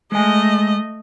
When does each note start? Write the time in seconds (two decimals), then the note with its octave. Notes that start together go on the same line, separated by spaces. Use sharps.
0.12 G#3 A3 D#5 G#5